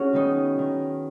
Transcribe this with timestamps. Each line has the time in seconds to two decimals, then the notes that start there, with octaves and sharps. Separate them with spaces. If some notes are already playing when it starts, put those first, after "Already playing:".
Already playing: C#4 F#4 G#4
0.13 D#3 B3 D#4
0.58 D#3